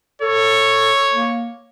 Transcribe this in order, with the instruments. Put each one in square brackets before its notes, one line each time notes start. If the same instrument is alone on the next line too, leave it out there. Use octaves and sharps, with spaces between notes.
[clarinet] A4 [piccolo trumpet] C#5
[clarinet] A#3